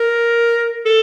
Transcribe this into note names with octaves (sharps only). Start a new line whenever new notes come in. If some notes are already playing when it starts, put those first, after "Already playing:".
Already playing: A#4
A4